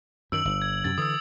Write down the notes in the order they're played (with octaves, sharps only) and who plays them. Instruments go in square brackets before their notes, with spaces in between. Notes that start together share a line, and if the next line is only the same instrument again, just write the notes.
[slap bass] F#2 D#3 [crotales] E6 D7 F#7
[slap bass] G1
[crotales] G#6
[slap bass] F#2 C3 [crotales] A6
[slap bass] D3 E3 [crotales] D#6 E6